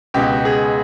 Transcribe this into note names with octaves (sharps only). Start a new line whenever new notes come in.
C#2 B2 G4
G#4